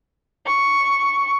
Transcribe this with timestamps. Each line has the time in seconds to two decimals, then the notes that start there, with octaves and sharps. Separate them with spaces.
0.46 C#6